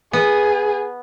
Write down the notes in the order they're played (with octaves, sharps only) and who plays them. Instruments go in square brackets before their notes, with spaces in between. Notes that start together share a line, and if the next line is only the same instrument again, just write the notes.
[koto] B3 [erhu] G#4